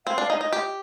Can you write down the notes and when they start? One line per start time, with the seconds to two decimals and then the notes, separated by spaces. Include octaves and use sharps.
0.06 C4 F5
0.18 D4
0.30 D#4 D#5
0.41 D#4
0.53 G4